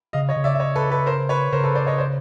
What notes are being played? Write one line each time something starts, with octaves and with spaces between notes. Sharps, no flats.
C#3 D#5 F5
C#5 D#5
C#3
D5 E5
E5
C#5 D#5
A4 B4
A4 B4
A#4 C5
B4 C#5
C#3 A#4 C5
A4 B4
C5 D5
C#5 D#5
C5 D5